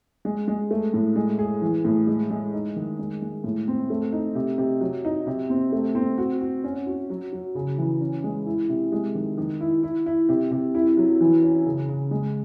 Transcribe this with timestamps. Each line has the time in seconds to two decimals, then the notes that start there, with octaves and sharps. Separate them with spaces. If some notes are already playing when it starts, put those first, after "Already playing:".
0.25 G#3
0.48 G#3
0.71 A3
0.94 A2
1.16 G#3
1.39 G#4
1.62 E3
1.85 A2
2.07 G#3
2.30 G#3
2.53 D#4
2.76 D#3
2.99 G#3
3.22 G#3
3.44 A2
3.68 C4
3.90 A3
4.13 D#4
4.35 C3
4.58 C3
4.81 F#3
5.05 D#4
5.27 C3
5.50 C4
5.72 A3
5.95 C4
6.18 F#4
6.41 F#4
6.64 C#4
6.86 F#4
7.10 F#3
7.33 F#3
7.55 C#3
7.78 E3
8.01 C#4
8.24 G#3
8.46 E4
8.69 C3
8.92 G#3
9.15 D#3
9.38 D#3
9.61 E4
9.83 E4
10.06 E4
10.29 C3
10.51 C3
10.75 E4
10.97 F#3
11.21 E3
11.43 C#4
11.66 C#3
11.88 C#3
12.11 G#3